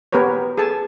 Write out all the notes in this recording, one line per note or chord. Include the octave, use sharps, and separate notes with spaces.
B3 G4 A#4 B4 C#5
G#4 A4 G#5 A5